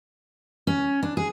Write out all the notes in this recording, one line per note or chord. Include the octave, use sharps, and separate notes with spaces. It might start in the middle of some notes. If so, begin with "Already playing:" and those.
C#4
D4
G#4